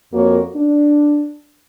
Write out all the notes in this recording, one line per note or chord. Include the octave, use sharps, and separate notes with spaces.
F2 A#3 F#4 A#4 C#5
D4